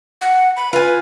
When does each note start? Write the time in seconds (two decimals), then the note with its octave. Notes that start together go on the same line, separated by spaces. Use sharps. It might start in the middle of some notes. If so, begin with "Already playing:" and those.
0.21 F#5
0.57 B5
0.73 F4 B4 G#5